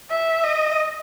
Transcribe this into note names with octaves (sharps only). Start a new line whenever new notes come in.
E5
D#5